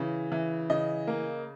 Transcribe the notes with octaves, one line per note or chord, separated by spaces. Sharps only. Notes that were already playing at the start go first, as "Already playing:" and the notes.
Already playing: C#3 E3
E3
C#3 D#5
A#3